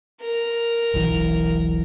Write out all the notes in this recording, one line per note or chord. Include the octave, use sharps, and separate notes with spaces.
A#4
E1 B1 E3